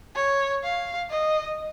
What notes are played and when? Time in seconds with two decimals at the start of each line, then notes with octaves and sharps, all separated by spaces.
0.15 C#5
0.63 F5
1.10 D#5